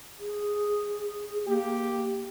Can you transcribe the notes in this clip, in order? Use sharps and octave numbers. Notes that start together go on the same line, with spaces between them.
G#4
A#3 G4